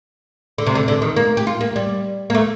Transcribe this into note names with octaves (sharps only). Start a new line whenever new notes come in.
D3
C3
D3
D3
D#3
A#3
G4
F4
A#3
G3
A#3
A3